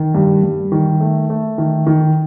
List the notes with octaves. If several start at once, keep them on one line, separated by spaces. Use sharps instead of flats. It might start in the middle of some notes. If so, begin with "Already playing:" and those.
Already playing: D#3
G2
G2
D#3
A3
A3
D#3
D#3